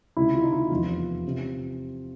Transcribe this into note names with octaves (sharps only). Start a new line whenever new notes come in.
C#2 C3 D#3 E4
F4
D#4
E4
F1 E2 C3 F4
C3